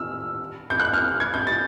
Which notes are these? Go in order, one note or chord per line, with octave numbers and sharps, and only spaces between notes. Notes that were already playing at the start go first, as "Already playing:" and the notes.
Already playing: E6 F6
G6
F#6
F6
G#6
G6
A6